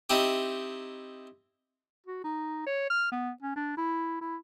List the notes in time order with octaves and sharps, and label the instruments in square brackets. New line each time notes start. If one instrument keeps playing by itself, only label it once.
[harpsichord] C4 D#4 E4 G4
[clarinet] F#4
D#4
C#5
F6
B3
C#4
D4
E4
E4